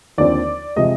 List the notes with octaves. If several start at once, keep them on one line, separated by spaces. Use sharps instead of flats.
D#2 D3 F3 C4 D5
C3 F3 G#3 D#5